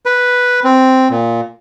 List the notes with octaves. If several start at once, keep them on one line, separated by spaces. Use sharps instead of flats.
B4
C4
A#2